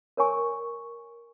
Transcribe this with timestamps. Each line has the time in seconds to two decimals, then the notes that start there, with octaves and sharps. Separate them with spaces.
0.17 A#4 C#5 G#5 C#6